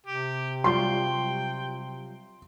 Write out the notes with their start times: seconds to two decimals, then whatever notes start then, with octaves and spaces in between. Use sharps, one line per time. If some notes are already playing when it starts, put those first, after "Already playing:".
0.06 C3 G4
0.64 F#3 G3 F4 G5 C6